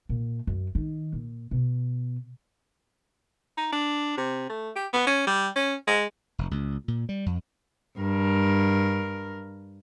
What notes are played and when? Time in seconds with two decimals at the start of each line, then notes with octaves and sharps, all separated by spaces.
0.09 A#2
0.47 F#2
0.75 D#3
1.13 A#2
1.51 B2
3.57 D#4
3.72 D4
4.17 C3
4.49 A3
4.76 G4
4.93 B3
5.07 C#4
5.27 G3
5.55 C#4
5.87 G#3
6.39 F1
6.51 C#2
6.88 A#2
7.09 G3
7.26 F2
7.98 G2 A#4